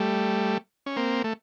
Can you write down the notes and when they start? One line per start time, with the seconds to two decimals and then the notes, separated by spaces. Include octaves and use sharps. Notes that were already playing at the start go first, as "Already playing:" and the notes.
Already playing: G3 A3
0.86 C#4
0.96 A#3 C4
1.24 A3